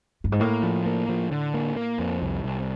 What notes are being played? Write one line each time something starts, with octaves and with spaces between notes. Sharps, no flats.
G2
G#2
A2 A#3
F3
A#3
F3
D3
A#3
A#3
F2
C2
C2